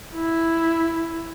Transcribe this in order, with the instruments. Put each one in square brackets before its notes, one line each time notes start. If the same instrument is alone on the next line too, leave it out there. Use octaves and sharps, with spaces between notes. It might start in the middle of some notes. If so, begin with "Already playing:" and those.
[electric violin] E4